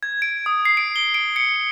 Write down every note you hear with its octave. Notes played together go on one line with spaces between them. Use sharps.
G#6
D7
D#6
C7
D7
G7
D7
C#7